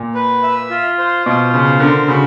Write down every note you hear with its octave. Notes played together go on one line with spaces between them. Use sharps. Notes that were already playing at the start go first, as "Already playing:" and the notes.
Already playing: A#2
B4
E5
F4
C5
B2 F4
C#3 C5
D3 A#4
C#3 F#4